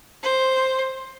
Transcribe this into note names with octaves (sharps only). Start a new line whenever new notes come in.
C5